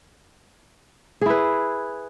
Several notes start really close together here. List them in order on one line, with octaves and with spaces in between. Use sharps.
G#4 E4 B4